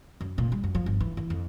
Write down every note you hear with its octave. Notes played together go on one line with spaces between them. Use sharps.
F#2
A#2
G3
F#2
F3
G1
E3
E3
F2